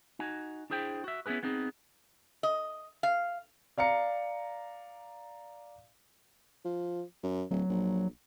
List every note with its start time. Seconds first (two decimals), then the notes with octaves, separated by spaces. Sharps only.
0.19 D#4 F#4 G#5
0.70 D4 E4 G#4 C5 G5
1.04 F#4 E5
1.26 B3 C#4 E4 G#4 B4
1.43 B3 C4 D#4 G#4
2.43 D#5
3.03 F5
3.78 D5 F5 A#5 C#7
6.65 F3
7.23 F#2
7.51 D1 F#3
7.70 A#1